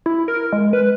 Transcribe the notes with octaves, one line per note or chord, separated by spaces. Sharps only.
E4
A#4
G#3
B4